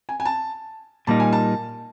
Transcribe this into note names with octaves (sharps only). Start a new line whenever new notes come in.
G#5
G#5
A5
A#2 G3 A#3 D#4 A5
G#5
A5